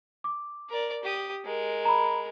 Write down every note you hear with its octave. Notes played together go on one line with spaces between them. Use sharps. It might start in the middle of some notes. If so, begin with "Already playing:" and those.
D6
A#4 D5
G4 D#6
G#3 A#4
A#5 B5